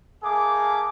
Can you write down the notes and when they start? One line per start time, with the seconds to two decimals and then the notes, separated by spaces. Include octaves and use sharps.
0.23 A3 A#3 G#4 D6